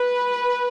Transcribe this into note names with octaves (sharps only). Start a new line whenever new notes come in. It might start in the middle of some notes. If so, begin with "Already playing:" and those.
Already playing: B4